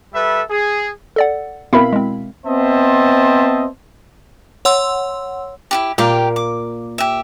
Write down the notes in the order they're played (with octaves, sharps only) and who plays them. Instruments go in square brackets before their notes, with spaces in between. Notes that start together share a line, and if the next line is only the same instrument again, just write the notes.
[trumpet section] G3 A4 B4 E5
G#4
[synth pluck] A4 D5 F#5
[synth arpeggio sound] B2 E4 B5 [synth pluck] C4 A#4 F5
[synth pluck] G#3 C4
[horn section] B3 C4 C5 D#5 E5 A5
[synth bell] C#5 F#5 C6 E6
[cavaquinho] E4 F4 G4
[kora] A#2 A#3 [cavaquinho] G4 F5 G5
[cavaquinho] D6
G4 E5